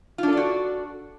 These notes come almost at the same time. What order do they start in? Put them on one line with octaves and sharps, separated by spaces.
F4 D4 A4 D5 F#4